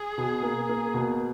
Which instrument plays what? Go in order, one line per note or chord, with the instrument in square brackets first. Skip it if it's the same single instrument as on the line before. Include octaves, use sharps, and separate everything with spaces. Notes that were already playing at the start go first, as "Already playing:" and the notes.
Already playing: [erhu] G#4
[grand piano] B2
A#3
A#3
B2